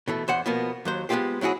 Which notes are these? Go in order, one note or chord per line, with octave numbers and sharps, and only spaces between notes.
B2 E3 A3
E2 C5 F#5
B2 F3 A#3 B3
D#2 F#3 C5
G#3 B3 D4 F4 G4 C5
F#3 C4 E4 F#4 G#4